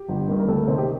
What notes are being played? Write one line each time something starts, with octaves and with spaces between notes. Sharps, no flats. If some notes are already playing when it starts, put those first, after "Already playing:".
Already playing: G4
G1
G2 D#3
A#4
D2 A4
C3 D#3 C5
G4